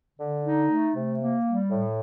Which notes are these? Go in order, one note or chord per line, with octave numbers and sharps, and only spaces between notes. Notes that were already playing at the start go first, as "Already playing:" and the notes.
D3
D#4
A3
C3
A#3
G3
A2